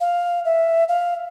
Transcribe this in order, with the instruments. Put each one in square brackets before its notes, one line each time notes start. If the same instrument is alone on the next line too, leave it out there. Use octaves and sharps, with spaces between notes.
[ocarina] F5
E5
F5